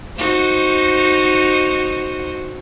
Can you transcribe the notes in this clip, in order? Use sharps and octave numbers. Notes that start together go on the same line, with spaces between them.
D#4 F#4 C5